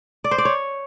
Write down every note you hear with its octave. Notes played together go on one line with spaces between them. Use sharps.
D5
C5
D5
C#5